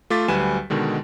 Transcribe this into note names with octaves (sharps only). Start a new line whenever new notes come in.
A3 F4 D6 A6 B6
D2 F#3 G3 B4 G#5 E7
B2 D3 D#3 G#3